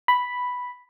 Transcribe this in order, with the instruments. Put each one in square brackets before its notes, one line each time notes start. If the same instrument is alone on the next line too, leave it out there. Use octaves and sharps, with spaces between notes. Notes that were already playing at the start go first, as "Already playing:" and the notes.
[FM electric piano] B5